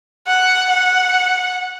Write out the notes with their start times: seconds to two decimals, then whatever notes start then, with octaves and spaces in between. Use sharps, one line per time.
0.27 F#5
0.69 F#5